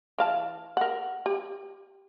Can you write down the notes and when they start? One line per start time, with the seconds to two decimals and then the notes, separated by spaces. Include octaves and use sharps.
0.18 E3 F5 A5
0.77 A#4 F#5
1.26 G4